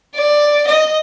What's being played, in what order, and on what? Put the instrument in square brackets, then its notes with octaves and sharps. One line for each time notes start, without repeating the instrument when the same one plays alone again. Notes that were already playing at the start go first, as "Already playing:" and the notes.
[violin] D5
D#5